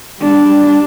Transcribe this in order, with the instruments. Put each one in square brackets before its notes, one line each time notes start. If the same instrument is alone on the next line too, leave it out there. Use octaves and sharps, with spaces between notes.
[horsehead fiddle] G3 D4